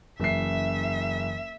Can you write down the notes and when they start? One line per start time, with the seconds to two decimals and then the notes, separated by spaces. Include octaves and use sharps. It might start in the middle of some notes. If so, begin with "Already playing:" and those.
0.20 F#1 F#2 E3 E5 C7